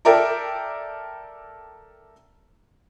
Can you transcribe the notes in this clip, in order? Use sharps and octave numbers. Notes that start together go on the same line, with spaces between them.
A4 A#4 D5 E5 G5 A#5